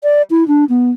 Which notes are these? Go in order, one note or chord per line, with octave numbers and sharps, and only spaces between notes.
D5
E4
D4
B3